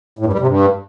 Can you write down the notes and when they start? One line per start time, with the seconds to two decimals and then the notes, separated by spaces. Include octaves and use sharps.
0.19 A2
0.26 G2
0.33 G3
0.40 C3
0.47 G2